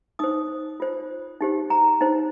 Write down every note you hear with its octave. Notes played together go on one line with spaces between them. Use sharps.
D#4 C5 D#6
F4 C5
D#4 G4 C5
A#5
D#4 C5